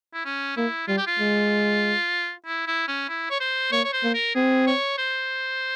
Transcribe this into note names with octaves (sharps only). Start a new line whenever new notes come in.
E4
C#4
A#3 E4
G3 F4
G4
F4
G#3
E4
E4
C#4
E4
C#5
C5
A#3 C#5
C#5
C5
A#3
A#4
C4 G#4
C#5
C5